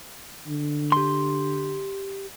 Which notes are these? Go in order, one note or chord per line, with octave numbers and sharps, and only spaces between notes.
D3
G4 C6